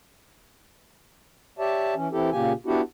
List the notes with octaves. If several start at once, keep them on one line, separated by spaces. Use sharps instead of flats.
G4 C#5 D5 E5 A5
E3 C#4
E3 C4 E4 G4 A4
A#2 C#3 A#3 G4 G#5
B3 D4 E4 F#4 G4